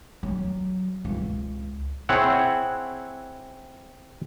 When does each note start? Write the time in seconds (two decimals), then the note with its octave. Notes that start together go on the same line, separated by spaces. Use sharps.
0.23 F#3
1.05 C#2
2.09 C4 E4 G#4 C#5 F#5